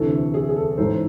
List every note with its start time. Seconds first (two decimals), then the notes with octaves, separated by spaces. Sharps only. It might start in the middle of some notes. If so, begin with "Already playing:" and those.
Already playing: D2 C3 E3 A4
0.34 G#4
0.49 G#4
0.56 A4
0.78 A1 G#2 E3 A4 C5